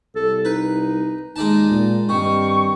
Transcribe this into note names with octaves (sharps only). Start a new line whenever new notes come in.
C2 A4
D#4 B4
D#2 G#3 D#4 D5 A5
A#2
G2 D#3 C4 C#6